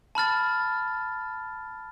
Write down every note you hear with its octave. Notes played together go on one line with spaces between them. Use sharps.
A5 B5 F6 A6